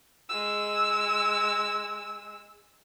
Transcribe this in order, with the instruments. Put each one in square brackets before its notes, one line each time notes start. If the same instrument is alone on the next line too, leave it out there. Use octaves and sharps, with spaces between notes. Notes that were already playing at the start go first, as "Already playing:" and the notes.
[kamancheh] G#3 E6